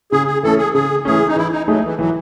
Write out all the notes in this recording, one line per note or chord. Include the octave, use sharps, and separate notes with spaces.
C#3 G#4
G#4
E3 A3 C#4 A4
G#4
C#3 G#4
E3 A3 C#4 G#4
D#4
E3 E4
D#4
F#3 A3 D#4 G#4
E3
E3 F#3